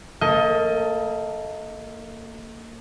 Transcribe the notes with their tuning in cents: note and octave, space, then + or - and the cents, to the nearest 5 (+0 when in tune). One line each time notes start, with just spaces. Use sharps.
A#3 -25 A4 +0 D#5 +20